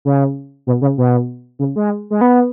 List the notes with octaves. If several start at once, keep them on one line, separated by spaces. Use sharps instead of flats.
C#3
B2
C#3
B2
C#3
G#3
G#3
B3